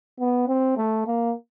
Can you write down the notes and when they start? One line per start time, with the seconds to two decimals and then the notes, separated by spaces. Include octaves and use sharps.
0.20 B3
0.48 C4
0.77 A3
1.07 A#3